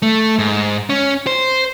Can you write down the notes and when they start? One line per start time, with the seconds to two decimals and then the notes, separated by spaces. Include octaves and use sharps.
0.02 A3
0.39 G#2
0.90 C#4
1.27 C5